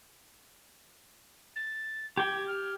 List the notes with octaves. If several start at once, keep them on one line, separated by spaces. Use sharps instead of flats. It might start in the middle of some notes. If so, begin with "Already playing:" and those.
A6
G4 G5 G#6
F6